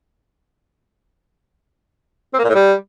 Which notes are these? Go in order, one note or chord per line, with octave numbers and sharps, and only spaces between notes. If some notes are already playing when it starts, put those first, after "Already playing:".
C4
A#3
A#2
A2
G3